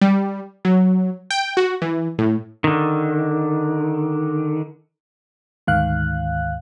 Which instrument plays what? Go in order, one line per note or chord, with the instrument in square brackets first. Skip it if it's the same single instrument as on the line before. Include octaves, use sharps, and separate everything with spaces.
[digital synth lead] G3
F#3
G5
F#4
E3
A2
[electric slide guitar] D3 D#3
[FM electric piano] D2 G#2 D#3 F5 F#6